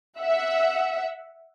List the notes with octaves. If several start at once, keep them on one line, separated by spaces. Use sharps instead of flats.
E5 F#5